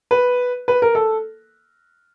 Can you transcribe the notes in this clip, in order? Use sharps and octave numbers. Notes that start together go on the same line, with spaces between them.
B4
B4
A#4
A4